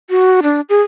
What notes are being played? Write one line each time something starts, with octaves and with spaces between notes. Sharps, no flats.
F#4
D4
G#4